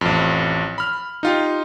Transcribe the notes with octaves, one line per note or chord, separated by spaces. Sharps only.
A1 F2
B5 F6
D#4 F4 G4